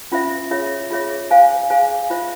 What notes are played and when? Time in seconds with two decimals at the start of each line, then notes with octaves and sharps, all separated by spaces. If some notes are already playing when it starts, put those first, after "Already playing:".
0.12 C#4 F4 C5 E5
0.51 F4 G#4 C#5 E5
0.91 F4 G#4 C#5 E5
1.30 G#4 C5 F5 G#5
1.70 G#4 C5 F5 G#5
2.10 F4 C5 E5